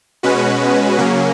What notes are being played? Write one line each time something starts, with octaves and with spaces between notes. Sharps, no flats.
B2 G#3 C#4 F#4 B4
C#3 F#3 A#3 C#4